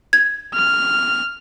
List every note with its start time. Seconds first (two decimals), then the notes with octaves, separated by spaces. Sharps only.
0.13 G#6
0.54 F6